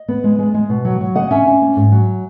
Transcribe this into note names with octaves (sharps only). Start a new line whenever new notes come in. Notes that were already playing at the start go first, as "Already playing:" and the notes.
Already playing: D#5
B3
G#3
G#3
G#3
B2
F#3
F#3
C#3 D#5 F#5
C#4 E5 G#5
C#4
A#3
G#2
F#3